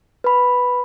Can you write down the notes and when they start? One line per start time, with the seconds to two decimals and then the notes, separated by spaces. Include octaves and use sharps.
0.24 B4 B5